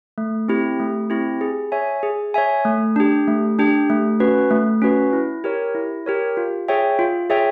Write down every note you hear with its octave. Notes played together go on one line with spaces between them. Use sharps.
A3
C4 E4 G4
A3
C4 E4 G4
G#4
C#5 E5 G#5
G#4
C#5 E5 G#5
A3
D4 G4
A3
D4 G4
A3
C#4 F#4 B4
A3
C#4 F#4 B4
E4
G4 A#4 C#5
E4
G4 A#4 C#5
F4
G#4 C#5 E5 G5
F4
G#4 C#5 E5 G5